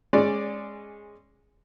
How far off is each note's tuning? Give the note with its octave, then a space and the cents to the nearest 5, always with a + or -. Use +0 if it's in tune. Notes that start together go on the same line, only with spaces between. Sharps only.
G#3 -5 C#4 -20 D5 +5